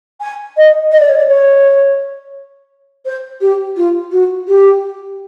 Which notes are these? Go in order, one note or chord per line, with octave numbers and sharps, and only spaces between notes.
G#5
D#5
D#5
D5
C#5
D5
C#5
C5
G4
F4
F#4
G4